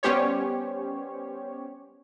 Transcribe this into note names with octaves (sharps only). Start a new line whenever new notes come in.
G3 B3 C#4 G4 C5 C#5